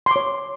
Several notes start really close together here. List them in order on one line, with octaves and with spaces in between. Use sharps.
C6 D6 C#5